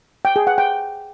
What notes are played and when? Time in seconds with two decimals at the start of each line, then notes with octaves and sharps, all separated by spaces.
0.25 G5
0.36 G#4
0.47 F#5
0.58 G5